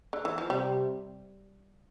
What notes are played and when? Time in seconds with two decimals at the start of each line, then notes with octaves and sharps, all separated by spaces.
0.13 D3
0.25 E3
0.38 F3
0.50 C3 G3